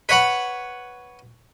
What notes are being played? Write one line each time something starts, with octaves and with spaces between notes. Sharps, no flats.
B4 C#5 F#5 B5